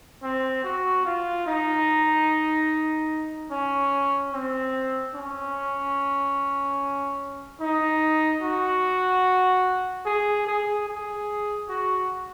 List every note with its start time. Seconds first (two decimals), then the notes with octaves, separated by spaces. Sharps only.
0.23 C4
0.64 F#4
1.05 F4
1.46 D#4
3.51 C#4
4.32 C4
5.14 C#4
7.60 D#4
8.42 F#4
10.06 G#4
10.47 G#4
10.88 G#4
11.69 F#4